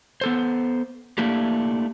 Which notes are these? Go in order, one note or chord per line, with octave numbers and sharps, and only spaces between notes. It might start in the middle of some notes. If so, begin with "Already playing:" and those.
B3 A4 C5
A3 A#3 D4 E4 G4